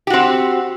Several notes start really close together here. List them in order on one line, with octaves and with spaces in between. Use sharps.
G4 F#4 C4